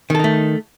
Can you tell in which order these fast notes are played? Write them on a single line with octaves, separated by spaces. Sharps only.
D#3 A4 D#4 A3